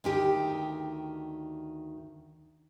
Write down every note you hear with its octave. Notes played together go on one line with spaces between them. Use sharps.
D2 D#3 G4